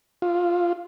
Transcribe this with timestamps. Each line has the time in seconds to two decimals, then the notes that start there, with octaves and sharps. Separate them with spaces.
0.22 F4